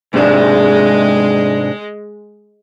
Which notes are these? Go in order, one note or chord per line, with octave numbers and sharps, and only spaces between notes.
G#2 C3 G#3 D4